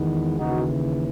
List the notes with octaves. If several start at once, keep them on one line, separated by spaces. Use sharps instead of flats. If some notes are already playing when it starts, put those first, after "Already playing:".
Already playing: E2 D#3 G#3 B3
D#2 C#3 E3 D#4 F#4